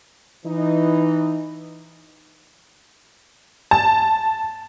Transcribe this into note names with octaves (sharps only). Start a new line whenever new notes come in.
E3 D#4
A5